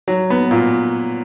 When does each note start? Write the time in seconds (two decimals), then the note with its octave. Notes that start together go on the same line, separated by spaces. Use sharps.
0.08 F#3
0.30 B3
0.51 A#2